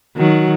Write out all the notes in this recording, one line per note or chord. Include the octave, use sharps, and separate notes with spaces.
D#3 F#3